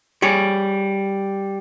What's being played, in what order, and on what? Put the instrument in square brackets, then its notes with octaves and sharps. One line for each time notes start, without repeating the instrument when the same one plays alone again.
[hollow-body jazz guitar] G3 G#4 C#5